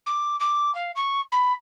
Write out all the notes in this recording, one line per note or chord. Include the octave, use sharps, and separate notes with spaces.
D6
D6
F5
C#6
B5